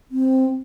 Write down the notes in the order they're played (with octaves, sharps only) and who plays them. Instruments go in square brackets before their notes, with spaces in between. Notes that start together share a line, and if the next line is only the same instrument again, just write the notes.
[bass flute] C4